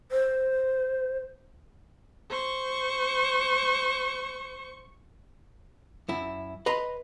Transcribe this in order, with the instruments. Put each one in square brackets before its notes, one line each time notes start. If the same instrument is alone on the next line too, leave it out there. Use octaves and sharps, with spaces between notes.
[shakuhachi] C5
[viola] C5 C#6
[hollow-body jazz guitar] F#2 E4
B4 D#5 A#5 C6